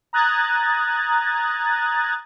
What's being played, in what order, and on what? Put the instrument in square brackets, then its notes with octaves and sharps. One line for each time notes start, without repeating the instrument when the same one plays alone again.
[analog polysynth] A#5 D#6 F#6 G#6 A6